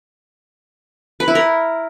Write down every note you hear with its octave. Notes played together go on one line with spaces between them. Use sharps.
B4
E4
A#4